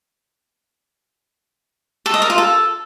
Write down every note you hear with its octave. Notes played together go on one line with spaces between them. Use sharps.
A4
D#5
A#4
F4
A4